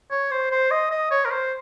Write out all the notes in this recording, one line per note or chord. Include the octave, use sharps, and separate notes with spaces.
C#5
C5
C5
D#5
D#5
C#5
A#4
C5